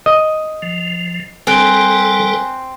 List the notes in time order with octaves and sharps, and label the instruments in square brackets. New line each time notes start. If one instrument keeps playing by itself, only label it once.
[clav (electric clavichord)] D#5
[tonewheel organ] F3
[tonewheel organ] G3 A4 A#4 [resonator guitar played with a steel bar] C4 [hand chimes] G#5 F#6